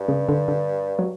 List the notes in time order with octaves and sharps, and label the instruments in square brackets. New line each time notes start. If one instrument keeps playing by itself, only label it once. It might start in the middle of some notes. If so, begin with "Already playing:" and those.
Already playing: [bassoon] G2
[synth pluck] C#3
D3
D3
F#3